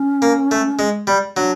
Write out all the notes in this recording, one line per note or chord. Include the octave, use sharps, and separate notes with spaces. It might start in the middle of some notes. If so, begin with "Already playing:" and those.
Already playing: C#4
A#3
A3
G#3
G3
F#3 D4